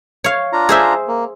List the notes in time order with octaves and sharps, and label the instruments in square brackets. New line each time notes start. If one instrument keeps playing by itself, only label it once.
[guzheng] C#5 F5
[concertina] D4 F4 A#5
[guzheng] G#4 C5 E5
[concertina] A#3